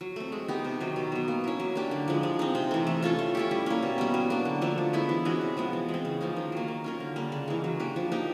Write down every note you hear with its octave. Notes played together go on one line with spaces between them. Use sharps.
F#3
A3 C4
G#3
B3 D#4 G4
C3
D#3 F#3
B2
F#3 B3
A#3
C#4 E4
F#3
A#3 D4 G4
D3
F3 G#3
G#3
C4 D#4
C3
E3 A3
A3
C#4 F4 A4
A3
C#4 E4 G4
G3
A#3 C#4
B2
G3 B3
F#3
A#3 D4
D3
F3 A3 D4
F3
G#3 B3 E4
E3
G#3 C#4 F#4
C3
F3 G#3 B3
E3
G#3
C4
C#3
F3 A#3 D#4
D#3
F#3 A#3
A#3
C#4 F4 A#4
D3
G3 A#3 D4
C#3
E3 G#3
F#3
A#3 D4 G4
F3
A#3 D#4 G4